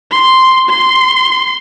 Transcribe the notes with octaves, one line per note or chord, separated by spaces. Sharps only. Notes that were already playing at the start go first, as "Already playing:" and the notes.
C6
C6